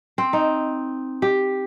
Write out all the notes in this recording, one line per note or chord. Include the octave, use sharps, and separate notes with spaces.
C4
D#4
G4